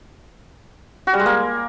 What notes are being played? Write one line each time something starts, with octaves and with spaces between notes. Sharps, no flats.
F#4
G3
G#3
A#3